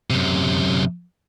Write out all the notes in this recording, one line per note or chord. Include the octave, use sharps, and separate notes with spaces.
F#2 C3